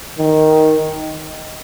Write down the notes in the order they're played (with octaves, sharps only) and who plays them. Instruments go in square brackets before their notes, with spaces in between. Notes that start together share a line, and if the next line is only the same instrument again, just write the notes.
[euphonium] D#3